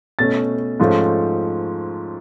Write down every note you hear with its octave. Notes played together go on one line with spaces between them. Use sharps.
B2 A3 C#4 A6
G#2 F3 A3 C#4